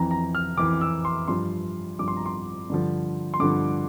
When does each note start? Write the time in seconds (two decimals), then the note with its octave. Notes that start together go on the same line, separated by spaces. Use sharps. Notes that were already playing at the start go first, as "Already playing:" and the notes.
Already playing: F2 E3 A#5
0.11 A#5
0.35 F6
0.57 F2 E3 D6
0.81 E6
1.05 C6
1.28 G2 F3 C6
1.99 G2 F3 D6
2.08 C6
2.17 A#5
2.26 C6
2.70 G2 D3 F3
3.34 C6
3.40 G2 D3 F3 D6